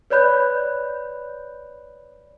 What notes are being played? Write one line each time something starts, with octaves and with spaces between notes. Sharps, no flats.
B4 C#5 D5 B5 F#6 G6